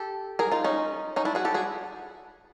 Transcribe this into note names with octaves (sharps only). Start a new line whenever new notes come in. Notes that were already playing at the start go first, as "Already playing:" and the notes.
Already playing: G4 A4
G#4 A#4
D#4 F4
C#4 D#4
C#4 D#4
D4 E4
F#4 G#4
G4 A4
F#4 G#4